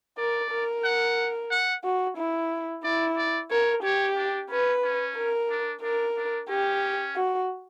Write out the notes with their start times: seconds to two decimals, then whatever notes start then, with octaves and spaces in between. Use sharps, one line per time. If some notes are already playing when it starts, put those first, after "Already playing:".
0.18 A#4 D5
0.51 A#4
0.84 F#5
1.51 F#5
1.84 F#4
2.17 E4
2.83 E4 D5
3.17 D5
3.50 A#4 C#5
3.83 G4 C#5
4.17 D4
4.50 C#4 B4
4.83 C#4
5.17 A#4
5.50 D4
5.83 D4 A#4
6.17 D4
6.49 C#4 G4
7.16 F#4